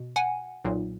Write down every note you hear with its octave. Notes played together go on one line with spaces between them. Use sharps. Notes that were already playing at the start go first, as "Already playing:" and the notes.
Already playing: B2
F#5 G#5
B1 A#2